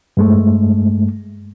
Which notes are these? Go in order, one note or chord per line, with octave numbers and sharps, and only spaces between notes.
G2 G#3 A3